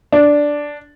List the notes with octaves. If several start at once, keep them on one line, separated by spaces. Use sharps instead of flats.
D4